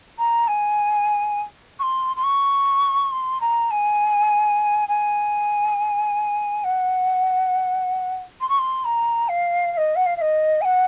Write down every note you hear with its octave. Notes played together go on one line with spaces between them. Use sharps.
A#5
G#5
C#6
C6
C6
C#6
C6
A#5
G#5
G#5
F#5
C6
C#6
C6
A#5
F5
F5
D#5
F#5
F5
F5
D#5
G#5
F#5